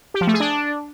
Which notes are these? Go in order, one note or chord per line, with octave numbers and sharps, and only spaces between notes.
G4
F3
A3
G#4
D4